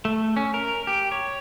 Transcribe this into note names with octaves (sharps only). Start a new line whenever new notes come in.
A3
C#4
A#4
G4
C#5